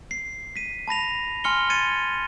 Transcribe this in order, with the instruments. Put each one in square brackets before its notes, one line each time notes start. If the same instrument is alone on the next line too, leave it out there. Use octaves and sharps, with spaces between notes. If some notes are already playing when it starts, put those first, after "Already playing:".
[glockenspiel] C7
B6 D#7
A5 B5 A#6 F7
G#5 C6 F6 C#7 G7
F6 G#6 A6 C#7 D#7